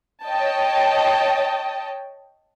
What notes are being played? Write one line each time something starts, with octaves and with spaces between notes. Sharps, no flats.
C#5 D#5 G5 A5